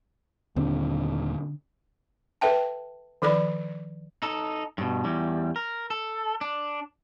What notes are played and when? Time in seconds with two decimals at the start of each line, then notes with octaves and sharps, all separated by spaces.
0.56 D#1 D#2 D3 C4 D4
2.41 A4 B4 E5 G5 A5
3.22 D#3 F3 A4 D5 B5
4.22 D#4 A4
4.78 G2 B2
5.05 E2 G3
5.56 A#4
5.90 A4
6.41 D4